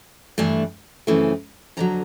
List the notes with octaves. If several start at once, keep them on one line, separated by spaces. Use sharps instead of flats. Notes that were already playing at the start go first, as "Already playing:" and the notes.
G2 E3 A3 D4
F#2 C#3 E3 A3 C4
F2 D3 F#3 A#5